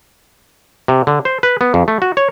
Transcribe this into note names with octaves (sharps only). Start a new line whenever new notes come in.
C3
D3
C5
B4
B3
F2
A3
F#4
C#5